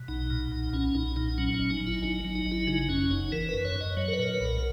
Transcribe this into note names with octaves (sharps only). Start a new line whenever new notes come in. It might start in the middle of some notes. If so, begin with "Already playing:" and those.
Already playing: B2
B1 D#4
A#2
B1
B1 C#4
B1 D#4
A#2 D#4
F#3 C#4
C#4
G#1
D#4
F#3
E4
G#1 D#4
F#3
D#4
G#1
E4
C#3 D#4
F#2 C#4
F#1 D#4
E3 A#4
B4
F#2
C#5
F#2 D#5
F#3 C#5
A#4
B4
A#2 A#4
B4
B1 A#4